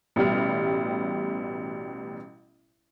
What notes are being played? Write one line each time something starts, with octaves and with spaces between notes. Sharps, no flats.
A1 B2 G3 F6